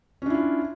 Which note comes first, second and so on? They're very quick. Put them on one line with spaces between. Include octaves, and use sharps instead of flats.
C#4 D4 E4 F4